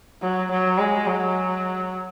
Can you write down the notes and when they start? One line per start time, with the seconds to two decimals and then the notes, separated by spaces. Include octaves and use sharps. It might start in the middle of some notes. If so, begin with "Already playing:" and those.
0.22 F#3
0.51 F#3
0.78 G#3
1.07 F#3